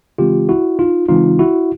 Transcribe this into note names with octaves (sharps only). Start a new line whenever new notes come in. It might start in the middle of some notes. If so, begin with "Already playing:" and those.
C#3 E3 G#3 C4 F4 G4
E4 F#4
D#4 F4
C#3 E3 G#3 C4 D#4 F4
E4 F#4